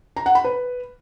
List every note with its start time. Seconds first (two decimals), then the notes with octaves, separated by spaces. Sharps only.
0.17 A#5
0.26 F#5
0.35 B5
0.44 B4